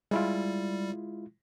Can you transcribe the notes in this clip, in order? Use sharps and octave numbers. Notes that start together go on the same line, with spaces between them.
G3 G#3 E4 F4